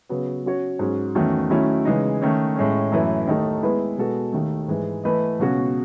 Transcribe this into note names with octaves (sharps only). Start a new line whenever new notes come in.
C#3 F#3 B3
F#3 C#4 F#4 C#5
G#2 F#3 C#4
E2 D#3 A3 C#4 F#4
D#3 F#3 A3 C#4 E4
C#3 E3 G#3 D#4
D#3 A3 C#4
A2 G#3 C#4
F#2 E3 A3 E4 B4
D#2 D#3 A3 D#4 A4
G#3 B3 E4 B4
B2 G#3 B3 F#4 A4
D#2 D#3 A3
G#2 E3 G#3
E3 A3 E4 B4 D#5
C#2 B2 F#3 C#4 F#4